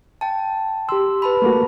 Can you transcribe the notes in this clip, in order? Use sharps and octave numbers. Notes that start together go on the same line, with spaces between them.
G5 A5
G4 C6 E6
B4 A5 B5
A3 A#3 F#4